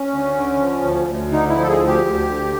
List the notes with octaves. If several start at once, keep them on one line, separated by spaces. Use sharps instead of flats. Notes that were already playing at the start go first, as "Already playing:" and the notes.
Already playing: C#4
D2
D3
F3
D2
D2
D3 D#4
E4
F3
A4
G#4
D2
G4
D2
D3